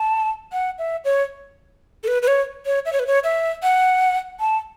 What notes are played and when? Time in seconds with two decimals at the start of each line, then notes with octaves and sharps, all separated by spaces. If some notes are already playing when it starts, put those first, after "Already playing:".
Already playing: A5
0.52 F#5
0.79 E5
1.05 C#5
2.04 A4
2.08 B4
2.22 B4
2.28 C#5
2.66 C#5
2.85 E5
2.93 C#5
2.99 B4
3.07 C#5
3.24 E5
3.63 F#5
4.40 A5